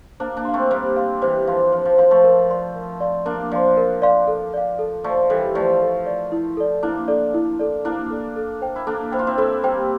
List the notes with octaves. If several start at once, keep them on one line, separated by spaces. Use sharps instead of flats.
A#3 D4 C5
A#3 D4
F5 C6
A3 C4
G3 A#3 C5
F5 C6
E3 G3 C5
F3 F5 C6
F3 C5
F3
F3 F5 C6
F3 A3
A#4
D5 F5 C6
A#4
D5 F5 C6
A#3 D4 A#4
F3 D5 F5 C6
A#4
D5 F5 C6
A4
D5 F5
A4
F3 A3 D5 F5
E3 G3 A4
F3 A3 D5 F5
A4
D5 F5
E4
A4 D5
A#3 D4 E4
A4 D5
E4
A4 D5
A#3 D4 E4
A4 D5
A4
C5 G5
E4
A#3 D4 A4
E4 C5 G5
F4
C4 E4
C4 E4 A4
G3 A#3 C5 G5